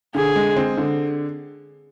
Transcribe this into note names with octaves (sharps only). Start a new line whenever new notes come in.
D3 G#4
G#3
C4
D3